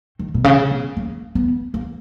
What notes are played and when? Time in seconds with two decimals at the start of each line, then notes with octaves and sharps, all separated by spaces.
0.19 D#3
0.34 B2
0.44 C#3
0.71 B3
0.97 A#3
1.35 B3
1.74 A#3